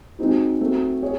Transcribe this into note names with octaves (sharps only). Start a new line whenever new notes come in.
G#3 C4 D#4 F#4
A3 C4 F#4
G#4 C#5